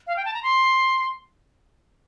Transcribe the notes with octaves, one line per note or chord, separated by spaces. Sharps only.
F5
G5
A5
A#5
C6